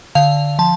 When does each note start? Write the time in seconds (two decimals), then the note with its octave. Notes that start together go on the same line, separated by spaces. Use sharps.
0.15 D3 F5
0.59 F3 A5